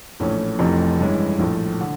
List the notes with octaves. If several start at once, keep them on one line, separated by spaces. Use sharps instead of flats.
A#1 A2 E3 A3 C#4
F1 F2 C3 E3 A3
G2 E3 G#3 C#4 E4
A#1 A2 F3 A3
D3